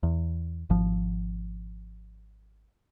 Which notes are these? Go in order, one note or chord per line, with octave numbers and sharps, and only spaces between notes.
E2
G#1 F3